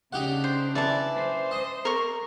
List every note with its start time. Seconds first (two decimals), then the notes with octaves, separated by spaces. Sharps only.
0.13 C#3 D4 D#4 G4 F#5
0.44 C5
0.75 E3 D5 A5
1.15 C5
1.51 D#5 D#6
1.85 A#4 C#6